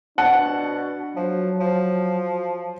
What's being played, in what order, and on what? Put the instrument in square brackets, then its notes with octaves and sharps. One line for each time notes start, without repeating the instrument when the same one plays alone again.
[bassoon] B2 [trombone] D4 [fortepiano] F#5 A5
[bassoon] F3 [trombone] F#3
[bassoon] F3